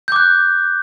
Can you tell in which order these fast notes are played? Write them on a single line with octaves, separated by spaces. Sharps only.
G6 D6 F#6